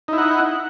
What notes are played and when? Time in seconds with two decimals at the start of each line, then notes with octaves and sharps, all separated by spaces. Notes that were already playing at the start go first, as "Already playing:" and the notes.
0.08 D#4
0.13 E4
0.18 F#5